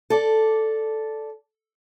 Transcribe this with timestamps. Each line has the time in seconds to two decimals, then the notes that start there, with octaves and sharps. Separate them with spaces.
0.10 A4 D5